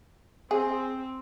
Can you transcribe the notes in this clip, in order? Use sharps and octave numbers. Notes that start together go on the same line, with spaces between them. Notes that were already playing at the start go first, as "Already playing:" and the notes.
C4 G#4